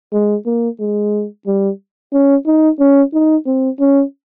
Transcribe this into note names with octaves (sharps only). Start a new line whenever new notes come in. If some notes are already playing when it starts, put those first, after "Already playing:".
G#3
A#3
G#3
G3
C#4
D#4
C#4
D#4
C4
C#4